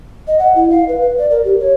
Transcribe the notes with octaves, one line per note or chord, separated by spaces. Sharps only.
D#5
F#5
E4
F5
B4
B4
D5
A#4
G4
C#5